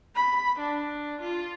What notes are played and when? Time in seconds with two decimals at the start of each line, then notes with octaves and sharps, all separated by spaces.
0.16 B5
0.60 D4
1.21 F4